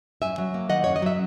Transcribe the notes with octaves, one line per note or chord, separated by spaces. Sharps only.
F#2 E5 G#5
F#3
A#3
D#3 D#5 F#5
F#2 C#5
D#5
F#3 E5